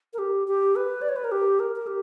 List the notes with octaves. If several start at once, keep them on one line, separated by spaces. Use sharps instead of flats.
A#4
G4
G4
B4
D5
C#5
B4
A#4
G4
A#4
A#4
G4